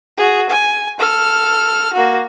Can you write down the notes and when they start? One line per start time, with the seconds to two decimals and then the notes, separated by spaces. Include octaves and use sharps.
0.17 F#4 G#4
0.49 G#5
1.00 A4 F6
1.93 A#3 F#4